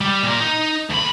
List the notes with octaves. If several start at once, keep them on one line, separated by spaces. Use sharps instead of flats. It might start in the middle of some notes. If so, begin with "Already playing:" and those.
G3
A#2 A#4
D#4
D2 B5